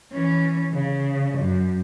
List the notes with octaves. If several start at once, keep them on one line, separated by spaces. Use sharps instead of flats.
E3 C#4
C#3
F#2